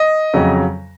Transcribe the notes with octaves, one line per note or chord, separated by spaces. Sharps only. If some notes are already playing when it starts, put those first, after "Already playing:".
Already playing: D#5
F2 C#3 F#3